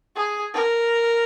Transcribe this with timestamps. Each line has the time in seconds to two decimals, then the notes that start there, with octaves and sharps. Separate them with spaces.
0.16 G#4
0.54 A#4